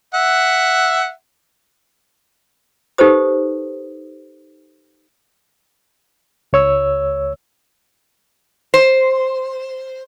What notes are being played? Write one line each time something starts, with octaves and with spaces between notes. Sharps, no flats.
E5 F#5
D#4 G4 A4 B4 C5 D#6
C#2 C#5 E6
C5